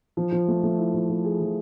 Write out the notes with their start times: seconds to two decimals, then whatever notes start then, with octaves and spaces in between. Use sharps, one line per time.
0.17 F3
0.32 F3
0.48 A3
0.63 A3
0.78 E4
0.94 F3
1.09 F3
1.24 G#4
1.40 F3